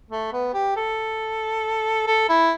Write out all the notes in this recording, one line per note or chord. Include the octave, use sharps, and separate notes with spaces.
A3
B3
G4
A4
A4
E4